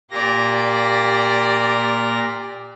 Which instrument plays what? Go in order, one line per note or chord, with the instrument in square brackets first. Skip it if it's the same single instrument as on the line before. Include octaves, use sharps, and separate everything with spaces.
[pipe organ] A#2 A#3 A#6 [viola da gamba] G4 D5